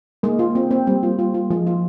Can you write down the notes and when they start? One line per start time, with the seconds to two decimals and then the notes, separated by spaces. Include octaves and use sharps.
0.23 G#3 A#3
0.39 F4
0.55 C4
0.71 C4
0.87 G3 C4
1.03 F4
1.19 F4
1.34 F4
1.50 F3 G#3
1.67 F4